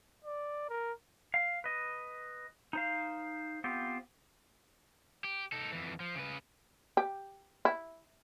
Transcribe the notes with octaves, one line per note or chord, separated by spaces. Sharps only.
D5
A#4
F5
B4 D#5
D#4 C5 F5
B3 C4 F4 G4
G4
D#4 A4
F2 E3
F3
C#3 B4
G4
E4